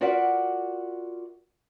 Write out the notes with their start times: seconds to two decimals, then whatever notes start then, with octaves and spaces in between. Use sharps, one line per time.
0.01 F4 F#4 A#4 D5 E5 F#5